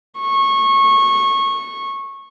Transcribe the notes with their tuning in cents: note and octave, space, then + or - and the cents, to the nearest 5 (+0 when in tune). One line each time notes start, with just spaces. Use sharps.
C#6 -20